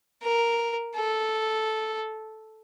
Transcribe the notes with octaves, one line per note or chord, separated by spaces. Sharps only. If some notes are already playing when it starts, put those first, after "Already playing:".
A#4
A4